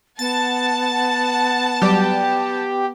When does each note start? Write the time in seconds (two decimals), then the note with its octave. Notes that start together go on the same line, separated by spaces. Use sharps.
0.19 B3 F#5 A5 A6
1.82 F#3 G3 G4 D5